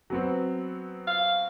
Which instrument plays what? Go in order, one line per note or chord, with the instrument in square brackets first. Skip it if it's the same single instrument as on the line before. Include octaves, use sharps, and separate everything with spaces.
[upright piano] F#3 B3 C4
[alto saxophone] F5